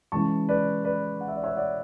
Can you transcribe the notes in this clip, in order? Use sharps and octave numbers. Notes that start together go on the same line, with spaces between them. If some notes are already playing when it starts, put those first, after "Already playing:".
C#3 E3 G#3 A5 C#6
B4 D5
B4 D5
F#5
E5
D5
C#5 E5
D5 F#5